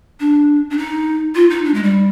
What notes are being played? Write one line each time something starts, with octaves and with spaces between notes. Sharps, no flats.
D4
D4
D#4
F4
D#4
D4
G#3
G3